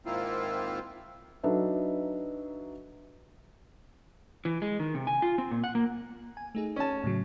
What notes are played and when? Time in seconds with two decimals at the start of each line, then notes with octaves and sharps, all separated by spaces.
0.06 G#2 D#3 A#3 C4 E4 F4
1.43 F#3 D4 D#4 A4 B4 E5
4.45 E3
4.62 G#3
4.80 D#3
4.95 C3
5.07 G#5
5.22 F4
5.38 C4
5.51 A#2
5.64 F#5
5.75 A#3
6.37 G#5
6.55 A3 D#4 G#4
6.76 C#4 A5
7.04 A2 C#3 F#3